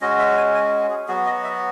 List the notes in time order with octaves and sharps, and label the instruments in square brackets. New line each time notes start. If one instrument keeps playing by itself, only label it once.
[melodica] G#3 C#4 F#4 D#5
E5
G#5
G#5
G#4
F#3 B3 F#4 G#4
D#5
E5